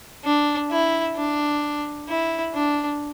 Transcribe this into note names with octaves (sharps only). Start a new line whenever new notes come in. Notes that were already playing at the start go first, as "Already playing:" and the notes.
D4
E4
D4
E4
D4